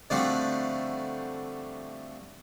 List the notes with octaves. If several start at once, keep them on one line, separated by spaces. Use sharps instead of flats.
D3 F3 G3 A3 C4 F#4